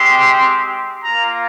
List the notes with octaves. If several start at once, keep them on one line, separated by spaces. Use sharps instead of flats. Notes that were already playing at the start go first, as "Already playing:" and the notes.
Already playing: G#3 C4 G4 C6
A#3 F4 A#5